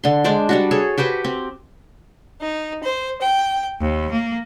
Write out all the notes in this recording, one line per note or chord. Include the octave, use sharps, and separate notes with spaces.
D3 C6
G#3 D4 C5 D5
G3 D4 F#4
G#4 A4 C#5
F#4 G4 B4 C5
C4
D#4
C5
G5
D#2
A#3